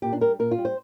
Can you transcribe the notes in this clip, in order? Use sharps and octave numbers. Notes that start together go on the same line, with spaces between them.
A#2 G4
D4
G3 A#4
A#2 A#4
F4
G3
C5